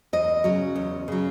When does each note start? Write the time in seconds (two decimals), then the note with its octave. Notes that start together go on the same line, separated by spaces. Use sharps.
0.13 E2 D#5
0.44 C#3 F#3
0.76 E2
1.08 C#3 F#3